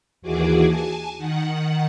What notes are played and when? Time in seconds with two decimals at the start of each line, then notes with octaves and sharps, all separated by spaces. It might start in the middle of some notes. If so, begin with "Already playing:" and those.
0.22 D#2 E3 F#4 G#4 D6
0.66 G#5 A5
1.17 D#3 F#5